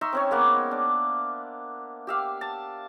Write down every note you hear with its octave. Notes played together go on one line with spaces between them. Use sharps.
D#4 E5 C6 C#6
C4 C#4 C#5
G#3 A#3 B3
D4
G4 E5 F5
A5